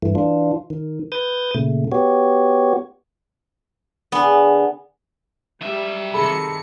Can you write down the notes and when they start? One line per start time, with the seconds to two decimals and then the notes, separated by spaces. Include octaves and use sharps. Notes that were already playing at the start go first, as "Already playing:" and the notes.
0.02 G2 E3 A3
0.15 E3 D4 F4
0.70 D#3
1.12 B4 D#6 G6 A6
1.55 A#2 C#3 A3
1.92 B3 F#4 G4 C#5
4.12 D3 B3 G#4
5.62 F#3 G3 E5
6.14 C3 D#3 G#4 A4 B5 C#7